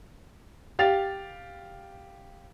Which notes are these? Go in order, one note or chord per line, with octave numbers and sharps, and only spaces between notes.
G4 F5 A6 F7